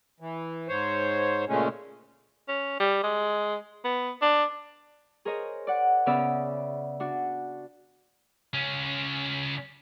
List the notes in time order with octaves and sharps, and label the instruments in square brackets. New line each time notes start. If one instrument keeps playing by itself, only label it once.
[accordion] E3
G#2 C5 C#5
A#2 C#3 G#3 A3 C#4
[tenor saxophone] C#4
G3
G#3
B3
D4
[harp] G#4 A#4 C5 C#5 D#5
D5 F#5
C#3 B3 C#4 D5 E5
D4 F#4
[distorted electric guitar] C#2 C#4